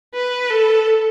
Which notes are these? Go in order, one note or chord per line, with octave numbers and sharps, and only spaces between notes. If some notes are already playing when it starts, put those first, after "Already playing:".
B4
A4